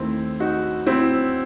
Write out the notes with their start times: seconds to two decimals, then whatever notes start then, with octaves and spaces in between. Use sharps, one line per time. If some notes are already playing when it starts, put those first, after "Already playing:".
Already playing: D#2 D#3 A3 C4 E4
0.40 D#4 F#4
0.87 C4 E4